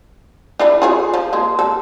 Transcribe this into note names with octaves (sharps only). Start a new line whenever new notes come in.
D4 E4 B4
F4 G#4 C#5
F3
G#3 A#3
A4